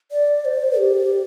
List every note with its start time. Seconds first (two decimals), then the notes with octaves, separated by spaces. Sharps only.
0.11 D5
0.45 C5
0.78 G4